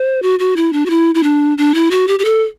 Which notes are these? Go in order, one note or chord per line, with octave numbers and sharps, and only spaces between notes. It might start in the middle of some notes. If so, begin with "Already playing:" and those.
Already playing: C5
F#4
F#4
E4
D4
F#4
E4
E4
D4
D4
E4
F#4
G4
G4
A4